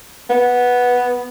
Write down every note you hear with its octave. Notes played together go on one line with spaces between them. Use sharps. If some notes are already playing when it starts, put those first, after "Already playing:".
B3